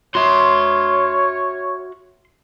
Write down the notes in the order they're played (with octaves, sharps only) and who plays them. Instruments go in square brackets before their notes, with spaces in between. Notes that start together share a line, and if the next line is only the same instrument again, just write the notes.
[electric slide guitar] F#4 E5 [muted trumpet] C#5 [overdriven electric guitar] C6